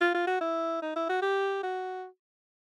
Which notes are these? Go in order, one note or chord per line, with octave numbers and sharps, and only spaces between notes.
F4
F4
F#4
E4
D#4
E4
F#4
G4
F#4